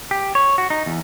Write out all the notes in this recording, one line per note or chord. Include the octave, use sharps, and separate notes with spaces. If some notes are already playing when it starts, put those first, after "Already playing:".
G4
C#5
F#4
D#4
E2